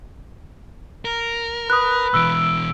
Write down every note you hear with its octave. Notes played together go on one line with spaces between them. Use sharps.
A#4
B4 D#6 F#6
B2 E3 E6 D7